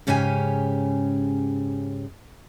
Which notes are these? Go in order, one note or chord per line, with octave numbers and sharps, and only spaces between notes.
G#2 C#3 C#4 G4 G#5